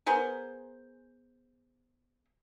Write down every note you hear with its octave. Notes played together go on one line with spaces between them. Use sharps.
B3 G#4 A#4 C5